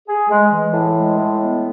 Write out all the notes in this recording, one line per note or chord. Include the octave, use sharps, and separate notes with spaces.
G#4
G#3
E3
A2
G#3
A2
B3